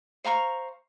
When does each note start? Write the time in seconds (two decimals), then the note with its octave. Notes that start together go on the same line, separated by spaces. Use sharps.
0.24 C5 F5 A#5 C#6